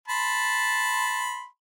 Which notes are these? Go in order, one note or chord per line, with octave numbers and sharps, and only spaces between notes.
A5 B5 C6